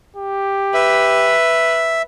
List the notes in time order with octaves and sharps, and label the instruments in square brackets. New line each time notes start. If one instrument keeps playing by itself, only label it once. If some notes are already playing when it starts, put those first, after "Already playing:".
[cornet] G4
[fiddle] B4 [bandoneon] E5